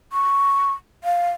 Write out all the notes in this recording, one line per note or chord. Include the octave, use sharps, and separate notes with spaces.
C#6
F5